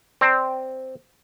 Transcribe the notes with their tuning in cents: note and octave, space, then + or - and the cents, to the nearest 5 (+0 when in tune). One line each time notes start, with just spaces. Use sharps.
C4 +0 D5 +0 A5 +40